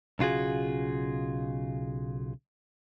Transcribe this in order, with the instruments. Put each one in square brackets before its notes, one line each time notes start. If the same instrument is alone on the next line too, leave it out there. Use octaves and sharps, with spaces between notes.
[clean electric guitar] B1 C#3 F4 F#4 G#4